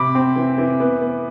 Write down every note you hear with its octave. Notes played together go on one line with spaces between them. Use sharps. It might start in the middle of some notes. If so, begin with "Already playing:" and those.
Already playing: C3 B5 D6
C4
E3
E3
B3
B3